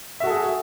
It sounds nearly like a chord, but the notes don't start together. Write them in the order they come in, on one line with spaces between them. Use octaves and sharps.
E5 F#4 A4 G#4